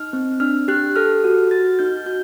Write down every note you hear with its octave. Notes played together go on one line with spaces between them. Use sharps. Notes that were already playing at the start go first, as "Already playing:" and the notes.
Already playing: D#4 F6
C4
D4 F6
G4 F#6
A4 F6
F#4
F#4 A6
D#4 G6
F#4 G6